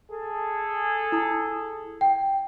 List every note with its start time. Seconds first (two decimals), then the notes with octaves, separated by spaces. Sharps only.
0.12 G#4 A4
1.12 E4 D#6
2.01 G5